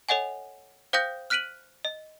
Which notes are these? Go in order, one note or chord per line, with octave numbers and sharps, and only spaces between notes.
A4 C#5 D#5 F#5 G#5
C5 F5 G5 D#6 G6 A#6
F6 F#6 B6 D7 D#7 F#7
D#5